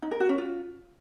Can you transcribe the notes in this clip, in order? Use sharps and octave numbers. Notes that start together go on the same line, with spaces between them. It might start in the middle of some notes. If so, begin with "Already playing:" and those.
D#4
A#4
F#4
C#4
F4